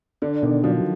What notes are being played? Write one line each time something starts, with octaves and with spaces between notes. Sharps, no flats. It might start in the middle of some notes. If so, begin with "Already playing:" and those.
D3 D4
B2 D#3
D3 F3 F#3